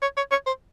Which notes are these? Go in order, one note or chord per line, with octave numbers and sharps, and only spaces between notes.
C#5
C#5
C#5
C5